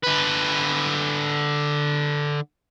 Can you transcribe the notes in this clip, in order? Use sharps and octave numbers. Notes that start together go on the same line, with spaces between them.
D3 B4